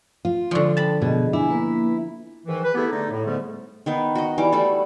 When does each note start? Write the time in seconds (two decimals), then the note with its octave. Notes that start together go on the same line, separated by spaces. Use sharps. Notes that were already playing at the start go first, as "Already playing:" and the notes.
0.25 F4
0.51 D3 F3 G#3 D5 C#6
0.77 A4 G5 A5 B5
1.02 B2 G#4 D#5
1.33 D4 E4 G#5
1.50 A#3 B4
2.46 G#2 D#3 E3
2.63 B4
2.75 A3 B3 E4 G4 G#4
2.91 D3 A3 D#4
3.10 A2
3.25 G#2 D3 G3 A3 B3
3.86 D#3 B3 D#4
4.15 F#4 D#5
4.38 E3 G3 D6
4.52 G3 A3 F#4 A4